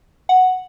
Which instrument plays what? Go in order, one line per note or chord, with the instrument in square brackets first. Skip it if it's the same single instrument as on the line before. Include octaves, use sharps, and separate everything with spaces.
[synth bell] F#5